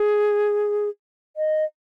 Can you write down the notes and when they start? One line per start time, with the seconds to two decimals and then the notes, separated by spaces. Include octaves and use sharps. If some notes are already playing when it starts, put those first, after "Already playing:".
Already playing: G#4
1.37 D#5